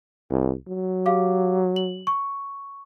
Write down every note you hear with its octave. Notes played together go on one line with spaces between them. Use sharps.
C2
F#3
G4 F5 D6
F#7
C#6